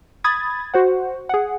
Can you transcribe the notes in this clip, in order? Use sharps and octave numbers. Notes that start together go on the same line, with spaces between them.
B5 D#6 G#6 A6
F#4 C5 F#5
G#4 F#5